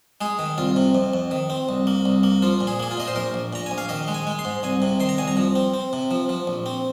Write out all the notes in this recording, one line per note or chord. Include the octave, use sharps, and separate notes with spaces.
G#3 G#4
D#3
C2 F4
C3
F2
F2
D#3
C4
C2
A#3
C2
A#3
F3 F4
A#2
G#4
A#3 G#4
F4
A#2 D#5
C5
A#1 A#4
A#1
A#2 A#5
A#1 G#5
F5
D#3 D#5
G#3
G#5
G#3
C6
G#2
C2 G#5
C3
D#3 C6
A#5
C2 G#5
A#5
F3
C4
C4
C3
F3
F3
A#1
C4